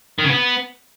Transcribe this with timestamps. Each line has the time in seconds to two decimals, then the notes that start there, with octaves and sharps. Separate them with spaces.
0.19 D#3
0.24 C#3
0.30 B3